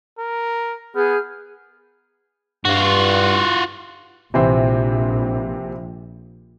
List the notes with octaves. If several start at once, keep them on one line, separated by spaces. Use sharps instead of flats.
A#4
B3 G#4 F6 G6
G2 F4 F#4
A#1 C3 E3 C4